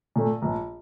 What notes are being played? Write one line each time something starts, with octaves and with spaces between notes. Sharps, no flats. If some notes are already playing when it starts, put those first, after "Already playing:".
A#2 A3
A#1